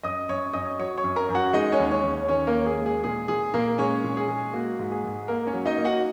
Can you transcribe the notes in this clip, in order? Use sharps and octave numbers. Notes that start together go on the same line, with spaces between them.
F#2 D#5 D#6
F#2 C#5 C#6
F#2 D#5 D#6
F#3 C#5 C#6
C#5 C#6
F#2
A#4 A#5
F#2
F#4 F#5
G#3 D#4 D#5
C#4 C#5
D#2
C#4 C#5
D#2
D#3 C#4 C#5
A#3 A#4
D#2
G#4
G#3
G#4
A#2 G#4
A#2 G#4
A#2 A#3 A#4
G#3 C#4 C#5
A#2
G#4
G#3
A#3 F#4
G#2
G#4
G#2
A#3 A#4
C#4 C#5
F#3
D#4 D#5
A#3
F#4 F#5